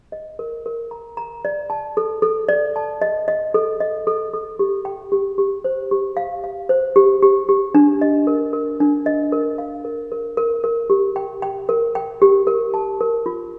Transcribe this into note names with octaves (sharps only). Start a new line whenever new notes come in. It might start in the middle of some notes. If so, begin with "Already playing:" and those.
D#5
A#4
A#4
A#5
A#5
D5
A5
A4
A4
D5
A5
D#5
D#5
A4
D#5
A4
A4
G4
G5
G4
G4
C5
G4
F5
F5
C5
G4
G4
G4
D4
D#5
A#4
A#4
D4
D#5
A#4
F5
A#4
A#4
A#4
A#4
G4
G5
G5
A#4
G5
G4
A#4
A5
A#4
F4